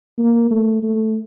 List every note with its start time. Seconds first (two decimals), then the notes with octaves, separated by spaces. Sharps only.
0.18 A#3
0.51 A3
0.83 A3